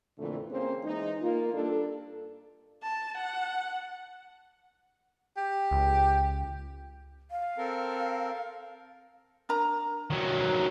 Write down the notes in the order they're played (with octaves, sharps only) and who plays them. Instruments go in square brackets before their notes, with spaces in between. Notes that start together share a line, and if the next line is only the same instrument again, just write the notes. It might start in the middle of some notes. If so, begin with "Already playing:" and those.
[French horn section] F2 A#2 D3 E3 A3
A#3 C4 C#4 G#4 C5
E3 G#3 D#4
A#3 F4
G2 D4 A4
[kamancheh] A5
F#5
[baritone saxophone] G4
[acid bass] C#2
[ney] F5
[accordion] C4 A4 A#4
[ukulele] D4 A#4 A#5
[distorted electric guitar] D#3 F#3